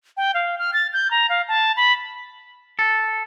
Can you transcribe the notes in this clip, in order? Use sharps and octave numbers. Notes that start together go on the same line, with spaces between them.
G5
F5
F6
A6
G6
A#5
F5
A5
B5
A4